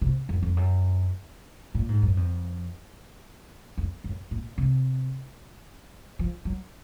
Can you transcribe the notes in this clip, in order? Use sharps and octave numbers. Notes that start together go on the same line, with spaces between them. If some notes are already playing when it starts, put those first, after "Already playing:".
C3
F#2
F2
F#2
A#2
G#2
F#2
F2
F2
F#2
A#2
C3
F3
F#3